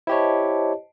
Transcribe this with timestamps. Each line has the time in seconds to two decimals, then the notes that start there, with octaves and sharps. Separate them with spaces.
0.07 E4 G4 C5 C#5 D#5 A5